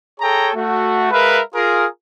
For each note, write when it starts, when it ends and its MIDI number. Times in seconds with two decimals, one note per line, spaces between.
0.21 0.50 68
0.21 0.50 69
0.21 0.50 73
0.21 0.50 79
0.21 0.50 80
0.21 0.50 82
0.55 1.11 57
0.55 1.11 66
1.11 1.40 56
1.11 1.40 70
1.11 1.40 71
1.11 1.40 76
1.11 1.40 77
1.11 1.40 83
1.55 1.85 65
1.55 1.85 68
1.55 1.85 70